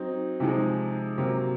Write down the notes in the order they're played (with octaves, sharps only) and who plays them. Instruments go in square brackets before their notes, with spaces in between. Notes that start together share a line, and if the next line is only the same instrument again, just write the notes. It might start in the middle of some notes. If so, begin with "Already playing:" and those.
Already playing: [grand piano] F#3 C4 D#4
C3 F3 G#3 D#4 G#4
C3 F#3 A#3